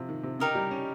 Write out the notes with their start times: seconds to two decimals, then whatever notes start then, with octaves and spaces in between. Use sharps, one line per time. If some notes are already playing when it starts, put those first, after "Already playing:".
Already playing: C3 F3
0.09 D#3
0.23 C3
0.39 C#3 D#4 G4 A#4 D#5
0.55 G3
0.71 C#4